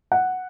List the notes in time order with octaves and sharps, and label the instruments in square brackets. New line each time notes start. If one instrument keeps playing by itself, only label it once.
[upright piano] F#5